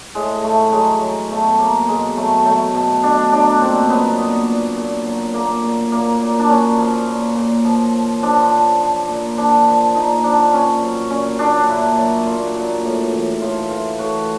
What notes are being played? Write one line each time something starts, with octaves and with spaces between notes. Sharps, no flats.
A2 G#3
A2 A3
F#3 G#3
F#3
B2 A3
F#3 A#3
B2 G#3
F#3 A3
F#3 A3
B2
B2 D4
F#3 D4
A#2 C4
F#3 B3
A#2
A#2
A#2
F#3
A#2 A#3
A#2
A#2 A#3
A#2
D4
A#2 C#4
F3
A#2
A#2
F3
F3
F3 D4
F3
F3
A#2
F3 D4
F3
A#2 D#4
F3 D4
A#2 C#4
F#3
A#2 C#4
A#2 D4
A#2 E4
F#3
A#2 F4
A#2
A2
E3
A2 F4
E3 F4
A2 F#4